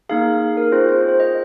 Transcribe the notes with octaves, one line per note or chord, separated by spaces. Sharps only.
A#3 D#4 G#4 F5
A#4
C4 F4 G#4 C5
C5
C5
D#5